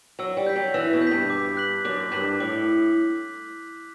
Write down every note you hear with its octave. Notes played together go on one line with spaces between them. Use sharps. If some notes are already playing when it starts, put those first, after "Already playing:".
F#3 E6
G3
G6 B6
F#3
E3 E6
B2
G6
G2 B6
D6
F#6 B6 F#7
F#2 D6
G2 F#6 B6 F#7
A2 D6